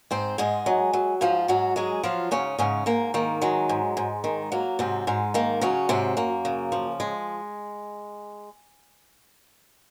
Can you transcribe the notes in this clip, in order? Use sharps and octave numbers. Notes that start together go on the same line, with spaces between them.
G#2 C4 C5
G#2 G#3 G#4
F#3
F#3
G#2 F3 F4
G#2 F#3 F#4
F#3 G#3 G#4
F3 F#3 F4
G#2 C#3 C#4
G#2 C#3 C#4
G#2 A#3
D#3 A#3
F#3 G#3
G#2
G#2
D#3
F#3 A#3
G#2 C3 C4
G#2 G#3
D#3 A#3
C#3 F#3 C#4
G#2 C3 C4
F#2 A#3
C#3
F3
G#3